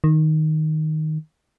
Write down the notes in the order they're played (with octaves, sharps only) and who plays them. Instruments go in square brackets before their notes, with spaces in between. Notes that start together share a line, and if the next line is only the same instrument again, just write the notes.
[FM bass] D#3